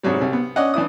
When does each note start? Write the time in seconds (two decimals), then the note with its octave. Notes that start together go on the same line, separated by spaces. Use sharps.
0.03 G#2 C3 F#3 G3
0.21 C2
0.33 B3
0.56 C#4 D5 D#5 F#5
0.74 E3 D4 E4 D#6